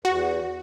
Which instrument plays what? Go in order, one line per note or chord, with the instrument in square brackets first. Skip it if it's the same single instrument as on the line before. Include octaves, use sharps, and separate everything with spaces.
[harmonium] E2 [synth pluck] F#4